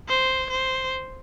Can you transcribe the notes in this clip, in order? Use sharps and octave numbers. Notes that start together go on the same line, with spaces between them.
C5
C5